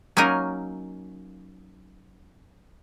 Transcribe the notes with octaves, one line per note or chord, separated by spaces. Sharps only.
F#3 A#3 C#4 D#4 A#4